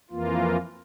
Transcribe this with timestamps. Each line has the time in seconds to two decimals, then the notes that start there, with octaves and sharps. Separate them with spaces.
0.10 F2 E3 A#3 F4